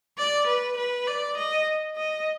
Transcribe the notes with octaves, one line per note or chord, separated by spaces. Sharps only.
D5
B4
B4
D5
D#5
D#5